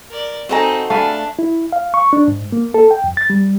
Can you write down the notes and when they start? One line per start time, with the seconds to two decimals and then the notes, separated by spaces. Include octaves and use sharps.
0.10 A#4 D5
0.49 C4 D#4 F#4 A4 D#5 G#5 A#5
0.90 A3 D4 F5 G#5 B5
1.39 E4
1.72 F5
1.94 C#6
2.13 D4
2.28 G#2
2.52 A#3
2.74 A4
2.91 G5
3.04 F2
3.17 A6
3.30 G3